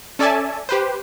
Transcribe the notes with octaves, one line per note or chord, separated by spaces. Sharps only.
C#4 A4 D5 E5 G#5 A5
G4 B4 C5